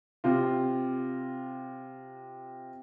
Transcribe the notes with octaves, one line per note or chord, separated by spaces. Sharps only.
C3 F4